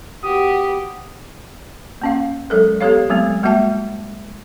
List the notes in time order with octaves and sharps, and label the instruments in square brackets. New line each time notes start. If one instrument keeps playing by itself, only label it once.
[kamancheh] B3 F#4 [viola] G4 [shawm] D#6
[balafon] A#3 C#4 F5
F#3 G#3 A4 A#4
B3 G4 A4 C#5 F5
F#3 G#3 A3 B3 C4
G3 G#3 A#3 F#4 E5 A5